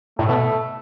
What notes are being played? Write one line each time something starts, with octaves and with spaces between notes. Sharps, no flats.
A2 A3
B2